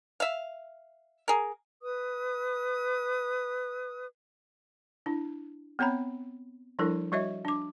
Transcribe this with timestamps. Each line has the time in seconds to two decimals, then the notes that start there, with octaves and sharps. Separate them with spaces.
0.20 E5 F5
1.28 G#4 A#4
1.81 B4 D#6
5.06 D4 E4
5.79 B3 C4 C#5 A#5 B5
6.79 F3 G3 D4 E4 A4 A#4
7.12 G3 F#4 C#5 D#5 E5
7.45 D4 D6